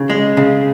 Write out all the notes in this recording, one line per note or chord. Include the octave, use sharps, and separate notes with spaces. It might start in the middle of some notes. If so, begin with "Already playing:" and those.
Already playing: C#3
G#3
C#3